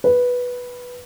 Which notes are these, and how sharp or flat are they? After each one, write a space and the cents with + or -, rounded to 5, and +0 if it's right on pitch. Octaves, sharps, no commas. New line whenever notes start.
B4 -5